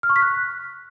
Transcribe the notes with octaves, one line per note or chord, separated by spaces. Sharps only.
F6
C#6
B6
F#6